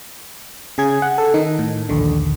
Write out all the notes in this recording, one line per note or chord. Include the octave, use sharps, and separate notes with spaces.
C#3 G#4 G#6
F#5
A4
D#3 D#4
A2
A#1 D#2 D3